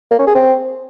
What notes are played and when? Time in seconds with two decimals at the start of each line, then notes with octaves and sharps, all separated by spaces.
0.11 A#3
0.19 C#4
0.27 G#4
0.35 C4